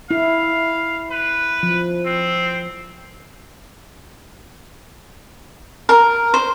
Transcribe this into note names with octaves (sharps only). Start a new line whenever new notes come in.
E4 F5
B4
F3
C4
A#4
C5